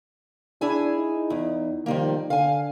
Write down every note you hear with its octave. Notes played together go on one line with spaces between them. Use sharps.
D4 E4 G#4 G#5
D#4
E2
D#3 F3 G3 A#3
D3 F5 G#5